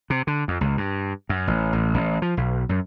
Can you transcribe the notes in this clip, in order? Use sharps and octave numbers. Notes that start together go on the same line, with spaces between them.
C3
D3
F2
C#2
G2
F#2
A1
A1
A1
F3
B1
F#2